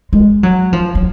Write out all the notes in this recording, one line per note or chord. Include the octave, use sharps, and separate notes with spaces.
G#3
F#3
F3
F#3